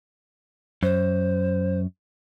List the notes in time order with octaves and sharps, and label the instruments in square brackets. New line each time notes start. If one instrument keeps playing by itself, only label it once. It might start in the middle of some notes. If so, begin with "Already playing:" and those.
[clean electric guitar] F#2 [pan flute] C5